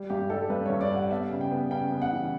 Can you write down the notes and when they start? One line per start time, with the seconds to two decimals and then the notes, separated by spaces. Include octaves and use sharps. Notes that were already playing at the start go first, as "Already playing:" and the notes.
Already playing: G3
0.10 G2 G4
0.30 G3 A4
0.50 G2 B4
0.66 C#5
0.70 G2
0.81 D5
0.90 G3
0.96 F#5
1.10 B3 E5
1.30 C#3
1.41 G5
1.51 B3
1.71 C#3 G5
1.92 B3
2.02 F#5
2.12 E3